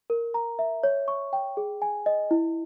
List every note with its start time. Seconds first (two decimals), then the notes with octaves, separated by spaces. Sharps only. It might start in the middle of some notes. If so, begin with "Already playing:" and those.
0.10 A#4
0.34 A#5
0.59 E5
0.83 C#5
1.08 C#6
1.33 G5
1.57 G#4
1.82 G#5
2.06 D#5
2.31 E4